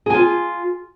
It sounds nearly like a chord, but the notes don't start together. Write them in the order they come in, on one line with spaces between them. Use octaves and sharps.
G#4 G#5 F4